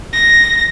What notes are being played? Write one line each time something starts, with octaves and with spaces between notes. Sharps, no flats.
A#6